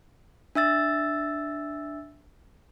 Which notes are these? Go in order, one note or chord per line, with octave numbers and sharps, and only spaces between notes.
D4 E5 E6 A6